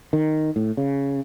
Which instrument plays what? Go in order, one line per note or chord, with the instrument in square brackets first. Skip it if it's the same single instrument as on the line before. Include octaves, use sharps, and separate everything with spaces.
[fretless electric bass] D#3
A2
C#3